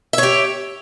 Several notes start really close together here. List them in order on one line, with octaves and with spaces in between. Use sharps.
E5 C#5 G4